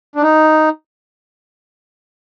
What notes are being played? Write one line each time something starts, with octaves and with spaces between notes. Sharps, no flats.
D4
D#4